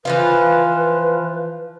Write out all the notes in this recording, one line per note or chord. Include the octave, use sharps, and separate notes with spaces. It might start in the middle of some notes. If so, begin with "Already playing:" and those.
E3 F3 F4 B4